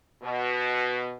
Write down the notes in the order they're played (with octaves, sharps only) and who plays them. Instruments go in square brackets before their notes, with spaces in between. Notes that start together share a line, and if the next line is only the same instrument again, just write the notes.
[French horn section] B2